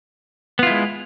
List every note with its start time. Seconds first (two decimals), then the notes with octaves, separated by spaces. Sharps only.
0.59 B3
0.63 F4
0.67 E4
0.71 G#3